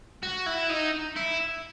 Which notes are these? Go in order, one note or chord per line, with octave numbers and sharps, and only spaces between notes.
F#4
E4
D#4
E4